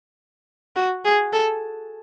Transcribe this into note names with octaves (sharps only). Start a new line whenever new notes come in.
F#4
G#4
A4